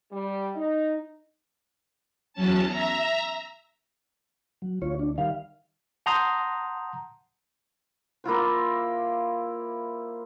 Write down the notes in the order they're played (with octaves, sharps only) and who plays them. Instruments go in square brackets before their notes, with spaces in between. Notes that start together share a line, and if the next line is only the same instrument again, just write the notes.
[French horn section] G3
D#4
[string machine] E2 F#3 C#4 A5
E5 A#5
[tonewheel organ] F#3
[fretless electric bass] D2 [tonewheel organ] F4 C#5
[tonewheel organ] D4
[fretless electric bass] D#3 G3 [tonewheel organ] F5
[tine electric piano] F#5 A5 A#5 C6 D#6 G6
[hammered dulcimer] A#3 E4 F4 C5